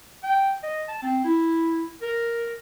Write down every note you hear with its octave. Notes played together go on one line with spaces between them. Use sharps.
G5
D#5
A5
C4
E4
A#4